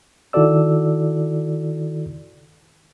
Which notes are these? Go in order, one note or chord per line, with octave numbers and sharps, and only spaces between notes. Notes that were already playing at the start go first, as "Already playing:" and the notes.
D#3 E4 F#4 A4 D5 E6